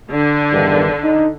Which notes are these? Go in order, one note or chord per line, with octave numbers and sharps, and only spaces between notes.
D3
E2 G2 D#3
D#4